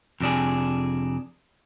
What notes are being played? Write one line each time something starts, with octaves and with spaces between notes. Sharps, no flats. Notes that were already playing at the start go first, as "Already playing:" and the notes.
F2 C3 D4 G#4